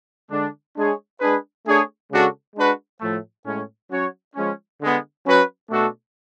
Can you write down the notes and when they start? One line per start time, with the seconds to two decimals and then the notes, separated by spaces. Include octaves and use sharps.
0.31 D3 G#3 D4
0.76 G#3 D4 G#4 C#5
1.20 G#3 D4 G#4 B4
1.65 A3 D4 G#4 C#5
2.11 C#3 G#3 D4 F#4 A4
2.56 G#3 D4 F#4 B4
3.01 A2 F3 A3
3.45 A2 G#3 C#4
3.91 F#3 C#4 F#4 C#5
4.36 F3 G#3 C#4
4.81 D3 G#3 B3
5.25 F#3 C#4 F#4 B4
5.70 B2 A3 D4 F#4 A4